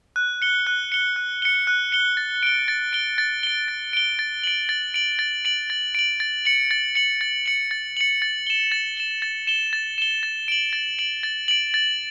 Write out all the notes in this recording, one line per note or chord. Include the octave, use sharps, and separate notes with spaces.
F#6
C#7 G7
F#6
C#7 G7
F#6
C#7 G7
F#6
C#7 G7
A6
D7 G7
A6
D7 G7
A6
D7 G7
A6
D7 G7
A6
D7 F#7
A6
D7 F#7
A6
D7 F#7
A6
D7 F#7
A6
C#7 F#7
A6
C#7 F#7
A6
C#7 F#7
A6
C#7 F#7
A6
E7 G7
A6
E7 G7
A6
E7 G7
A6
E7 G7
A6
D7 F#7
A6
D7 F#7
A6
D7 F#7
A6